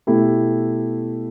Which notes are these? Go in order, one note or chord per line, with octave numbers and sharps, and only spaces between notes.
B2 A3 E4 G4